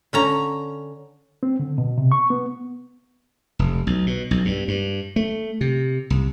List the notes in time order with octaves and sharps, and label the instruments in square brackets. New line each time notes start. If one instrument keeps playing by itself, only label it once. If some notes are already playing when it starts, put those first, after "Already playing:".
[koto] D3 C#4 A#5
[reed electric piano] C4
D3
B2
C3
C#6
B3
[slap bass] F1
B1
B2
B1
G2
G2
A3
C3
C2